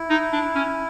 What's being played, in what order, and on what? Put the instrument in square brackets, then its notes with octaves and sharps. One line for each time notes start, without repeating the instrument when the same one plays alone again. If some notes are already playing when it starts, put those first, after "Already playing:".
Already playing: [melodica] E4
[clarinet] D#4
D4
C#4